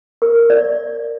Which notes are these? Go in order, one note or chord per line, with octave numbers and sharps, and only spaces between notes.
A#4
D5